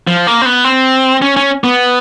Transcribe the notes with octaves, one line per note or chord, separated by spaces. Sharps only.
F3
A#3
C4
B3
C4
C#4
C#4
B3